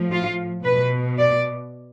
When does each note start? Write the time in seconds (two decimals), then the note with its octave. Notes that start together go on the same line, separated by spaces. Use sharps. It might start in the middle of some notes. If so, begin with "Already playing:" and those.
Already playing: A2 F3
0.11 F4
0.64 B2 B4
1.18 D5